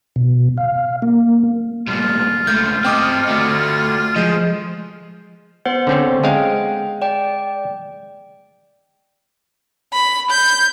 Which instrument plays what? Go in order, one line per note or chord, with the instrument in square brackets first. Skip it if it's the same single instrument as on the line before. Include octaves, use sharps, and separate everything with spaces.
[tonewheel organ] B2
F5
A#3
[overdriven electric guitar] G2 A#2 [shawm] F4
[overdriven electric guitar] C#2 A3 [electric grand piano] G6
[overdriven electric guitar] C4 D#5 [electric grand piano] G5 D6 D#6
[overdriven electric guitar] A3 F#4
[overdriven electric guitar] F3 [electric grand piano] G#3 D#5 [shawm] C5
[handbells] B3 C5 F#5
[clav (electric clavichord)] D3 C4 C#4
[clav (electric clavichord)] G#3 F5 [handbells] G5
[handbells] D5 G5
[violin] B5
G6